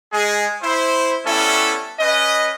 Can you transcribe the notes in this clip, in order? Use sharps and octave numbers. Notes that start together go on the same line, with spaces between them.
G#3 G#4
E4 C5
G3 B3 C#4 E4 A4
C#4 B4 D#5